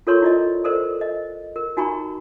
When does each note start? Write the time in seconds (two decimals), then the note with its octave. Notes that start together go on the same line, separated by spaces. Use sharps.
0.07 F4 A4 A#4 C#5 C6 C#6
0.22 E4 D5 D#5
0.64 A4 A#4 C5 D5
1.01 D#5
1.56 A#4
1.77 D#4 F#4 G#5 A#5 B5 C#6